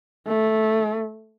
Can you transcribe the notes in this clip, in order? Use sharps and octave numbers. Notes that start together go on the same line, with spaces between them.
A3